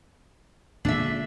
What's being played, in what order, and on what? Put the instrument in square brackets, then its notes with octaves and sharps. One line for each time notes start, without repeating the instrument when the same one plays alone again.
[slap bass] A#2 D3 G#3 [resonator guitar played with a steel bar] D4 E5